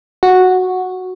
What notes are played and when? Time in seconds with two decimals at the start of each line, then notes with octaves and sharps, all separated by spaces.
0.23 F#4